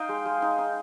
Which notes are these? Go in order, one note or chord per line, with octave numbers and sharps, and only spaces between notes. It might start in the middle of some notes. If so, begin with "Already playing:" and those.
Already playing: D#4 D#5 F5 G5
G#3
G#3
D#4
D#4